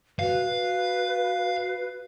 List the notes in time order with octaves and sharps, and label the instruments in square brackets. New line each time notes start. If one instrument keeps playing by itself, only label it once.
[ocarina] F#4 [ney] B4 [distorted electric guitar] F5